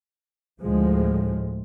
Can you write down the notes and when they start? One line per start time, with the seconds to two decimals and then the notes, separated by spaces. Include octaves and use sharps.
0.60 D2 A2 F3 G#3